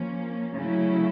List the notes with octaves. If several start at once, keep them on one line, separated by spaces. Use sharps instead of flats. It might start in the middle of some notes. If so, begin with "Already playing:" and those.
Already playing: F3 A#3 C#4
C#3 F#3 A3 C#4 E4